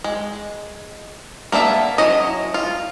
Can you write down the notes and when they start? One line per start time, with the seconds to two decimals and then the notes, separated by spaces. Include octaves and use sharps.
0.04 G#3
1.52 A#3 B3 D4 E5
1.98 F#3 C#4 E4 D#5
2.54 F4